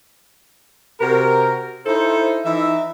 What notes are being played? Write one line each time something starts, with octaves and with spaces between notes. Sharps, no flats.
C3 F#4 A#4
D#4 E4 A4 C5
E3 D#4 E5